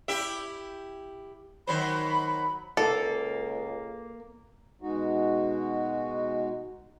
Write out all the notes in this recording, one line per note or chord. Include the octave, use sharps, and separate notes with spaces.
E4 G4 E5
D#3 F#3 C5 B5
C#2 A#3 A4
B2 G#3 D#4 F#4